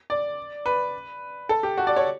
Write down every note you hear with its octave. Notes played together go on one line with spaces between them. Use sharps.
D5
B4
A4
G4
F#4
D5
C#5